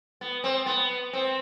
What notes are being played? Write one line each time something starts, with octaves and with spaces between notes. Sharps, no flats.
B3
C4
B3
C4